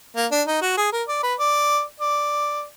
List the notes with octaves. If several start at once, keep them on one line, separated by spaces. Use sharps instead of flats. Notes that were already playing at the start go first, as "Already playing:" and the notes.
A#3
D4
D#4
F#4
G#4
A#4
D5
B4
D5
D5